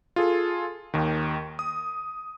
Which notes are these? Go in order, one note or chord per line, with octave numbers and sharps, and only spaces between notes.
F4 G#4 A4
D#2 D#3
D#6